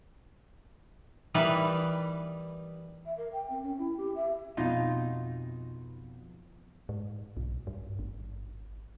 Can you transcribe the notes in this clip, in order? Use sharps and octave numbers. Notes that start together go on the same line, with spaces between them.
E3 G3 A#3 D#4 B4
E5
A#4
G5
C4
C#4
E4
G4
E5
F2 B2 D#4 F4
G#2
B1
G2
G#1